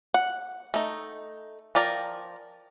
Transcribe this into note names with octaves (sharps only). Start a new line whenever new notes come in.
F#5
A3 D#4
F3 A#4 D5 G5 A#5